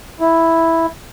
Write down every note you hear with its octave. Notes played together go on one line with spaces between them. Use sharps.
E4